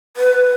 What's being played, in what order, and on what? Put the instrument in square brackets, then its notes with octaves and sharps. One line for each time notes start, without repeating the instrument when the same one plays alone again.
[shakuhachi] B4